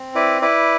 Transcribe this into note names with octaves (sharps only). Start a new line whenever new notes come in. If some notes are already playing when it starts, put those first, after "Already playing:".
Already playing: C4
E4 B4 D5
E4 B4 D5